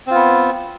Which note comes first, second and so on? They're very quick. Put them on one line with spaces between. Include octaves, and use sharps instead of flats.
C4 F4 B3